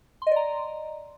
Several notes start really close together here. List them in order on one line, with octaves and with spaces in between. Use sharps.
C6 D#5 D5 A#5